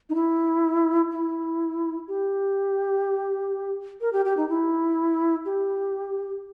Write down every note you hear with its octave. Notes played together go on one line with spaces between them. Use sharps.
D#4
E4
E4
G4
A#4
G4
G4
D#4
E4
G4